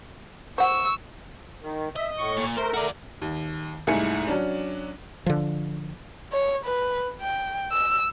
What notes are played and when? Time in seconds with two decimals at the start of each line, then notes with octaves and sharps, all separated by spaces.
0.58 C5 F#5 C#6 E6
1.62 D#3
1.96 D#5 E5
2.17 A2 C#6
2.37 A#2
2.57 A3 A#4 C5
2.73 F#4 D5
3.22 D#2
3.87 C2 G#2 A3 E4 G#5 C#7
4.28 F#3 C#4 D4
5.26 D3 F3
6.32 C#5
6.65 B4
7.21 G5
7.72 E6